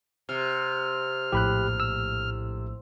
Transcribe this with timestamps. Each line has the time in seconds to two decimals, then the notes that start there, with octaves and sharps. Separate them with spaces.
0.29 C3 F6
1.32 A#1 A2 G4 B5 F#6
1.80 E6